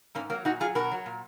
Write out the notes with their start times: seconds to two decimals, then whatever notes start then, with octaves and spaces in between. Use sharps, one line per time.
0.15 G#2 A#3 C#4
0.30 F#3 A#3
0.45 A#2 D#4 F#4
0.60 F#3 F4 G#4
0.75 B2 F#4 A#4
0.91 F#3
1.06 A#2